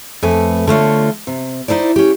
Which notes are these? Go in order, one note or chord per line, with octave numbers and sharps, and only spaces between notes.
F2 A3 B4 G#5
D3 A3 F4 C#5
C3
D#4 E4 C5 D5
C#4 G4